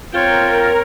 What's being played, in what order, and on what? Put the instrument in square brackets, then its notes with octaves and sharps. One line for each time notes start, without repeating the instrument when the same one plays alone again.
[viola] C4 C#5 [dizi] F4 [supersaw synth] A#4 [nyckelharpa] G5